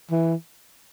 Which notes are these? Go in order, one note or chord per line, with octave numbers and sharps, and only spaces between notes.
E3